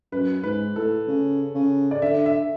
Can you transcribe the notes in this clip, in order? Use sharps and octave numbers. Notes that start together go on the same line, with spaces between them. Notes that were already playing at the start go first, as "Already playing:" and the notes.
F#2 B4
G#2 B4
A2 A4
C#3
C#3
D5
D3 E5
E5